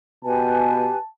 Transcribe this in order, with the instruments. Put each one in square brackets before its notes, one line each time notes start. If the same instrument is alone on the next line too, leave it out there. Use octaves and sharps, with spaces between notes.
[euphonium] B2 [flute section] G4 B4 G#5 [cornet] A5